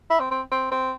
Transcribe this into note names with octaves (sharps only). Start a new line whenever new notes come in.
E4
C4
C4
C4
C4